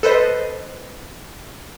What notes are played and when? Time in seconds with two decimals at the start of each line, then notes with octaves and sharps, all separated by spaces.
0.03 A4 B4 C5 D#5